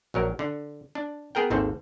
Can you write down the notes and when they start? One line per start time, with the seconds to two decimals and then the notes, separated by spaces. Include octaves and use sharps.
0.14 A#1 F#3 A#4
0.39 D3
0.95 D4
1.35 B3 G#4 A#4 G5
1.50 G#1 D#2 G#2 C4 A4